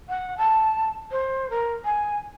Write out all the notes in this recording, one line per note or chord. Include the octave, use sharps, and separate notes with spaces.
F#5
A5
C5
A#4
G#5